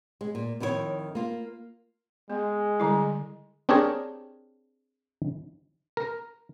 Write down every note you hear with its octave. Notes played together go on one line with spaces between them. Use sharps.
G#3
A#2
F2 D#3 E4 F#4 C#5
A#3 F4
G#3 B3
D3 G3 E4
C4 D4 G4 G#4 A#4 C#5
A#4